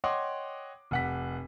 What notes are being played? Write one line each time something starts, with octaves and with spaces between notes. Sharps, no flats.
C#5 D#5 F#5 G5 C6 D6
F1 F#5 B6